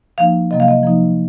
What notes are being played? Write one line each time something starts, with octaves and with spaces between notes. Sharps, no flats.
F3 A#3 D#4 F5
C3 F#3 A#3 D#5
F5
D#5
F3 A#3 D#4